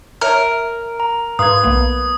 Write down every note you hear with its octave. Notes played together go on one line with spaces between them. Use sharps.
A#4 C#5 E5 F6
A#5
G#2 B4 F5 C6 D#6 G#6
B1 A#3 B3